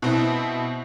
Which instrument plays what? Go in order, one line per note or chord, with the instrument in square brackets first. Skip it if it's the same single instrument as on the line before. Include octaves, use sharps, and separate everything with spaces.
[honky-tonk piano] B2 C4 E4